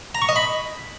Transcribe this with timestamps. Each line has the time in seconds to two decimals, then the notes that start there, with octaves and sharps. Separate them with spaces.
0.15 A#5
0.22 C#6
0.29 D#5
0.36 B5